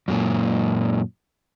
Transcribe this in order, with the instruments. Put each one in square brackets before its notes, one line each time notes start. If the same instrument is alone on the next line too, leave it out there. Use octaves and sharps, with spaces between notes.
[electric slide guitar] F#2 A#2